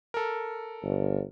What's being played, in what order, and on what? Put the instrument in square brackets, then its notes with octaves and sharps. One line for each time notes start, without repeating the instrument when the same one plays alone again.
[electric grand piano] A4 A#4
[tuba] G1